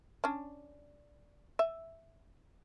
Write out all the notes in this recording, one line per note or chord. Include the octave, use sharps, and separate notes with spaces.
C#4 D4
E5